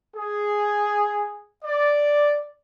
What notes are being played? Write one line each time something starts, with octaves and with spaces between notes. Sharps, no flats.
G#4
D5